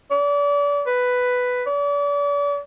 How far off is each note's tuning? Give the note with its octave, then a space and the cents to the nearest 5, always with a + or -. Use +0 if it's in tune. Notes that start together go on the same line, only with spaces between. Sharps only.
D5 -35
B4 +5
D5 -40